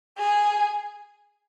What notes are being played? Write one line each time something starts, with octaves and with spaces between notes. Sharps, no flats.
G#4